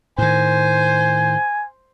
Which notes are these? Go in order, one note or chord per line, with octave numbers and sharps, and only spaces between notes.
A2 D#3 C5 G#5